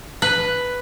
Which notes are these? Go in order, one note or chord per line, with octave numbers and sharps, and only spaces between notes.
B4